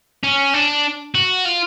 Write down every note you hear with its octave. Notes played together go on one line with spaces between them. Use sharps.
C#4
D4
F#4
F4